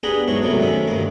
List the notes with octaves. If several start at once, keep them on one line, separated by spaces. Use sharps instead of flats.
B3 D4 G4 G#4 A#5 B5
G#2 F#3 B3 E4 C#6
F#2 C3 F#3 G3 A3
A2 D#3 C#4 E5 B5
D2 G2 D#3 A#3